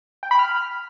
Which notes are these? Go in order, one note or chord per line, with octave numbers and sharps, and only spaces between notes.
G5
B5
F6